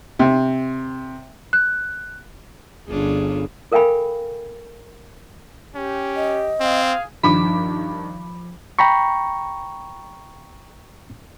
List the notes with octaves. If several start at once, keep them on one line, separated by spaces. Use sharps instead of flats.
C3
F#6
G1 C#4 D4 F4 G#4
A4 A#4 F5 G5 G#5 B5
C#4 G4
D#5
C4 G#4 F5
G2 D#3 F3 B5 D6
G5 A#5 B5 C#6